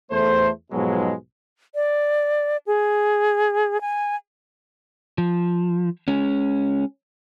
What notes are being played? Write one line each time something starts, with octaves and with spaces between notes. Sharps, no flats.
E2 A3 C5
B1 G#2 B2 F3 F#3 G#3
D5
G#4
G#5
F3
G#3 C#4